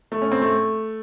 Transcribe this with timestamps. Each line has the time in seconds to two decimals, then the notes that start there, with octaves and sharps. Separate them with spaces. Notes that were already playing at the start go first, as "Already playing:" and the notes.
0.12 A3
0.22 C#4
0.32 C4
0.41 A3